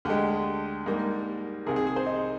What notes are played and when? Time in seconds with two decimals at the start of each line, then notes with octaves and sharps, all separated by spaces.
0.05 D2 D3 G#3 G4
0.86 G#2 G3 A#3
1.66 C2 C3 D#3 G#4
1.76 G#4
1.87 G#4
1.96 C5
2.06 D#4